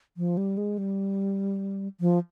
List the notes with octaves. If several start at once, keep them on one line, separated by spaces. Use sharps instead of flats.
F3
G3
G#3
G3
F3